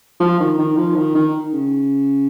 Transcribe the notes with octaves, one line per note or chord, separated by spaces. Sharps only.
F3
D#3
D#3
F3
D#3
D#3
C#3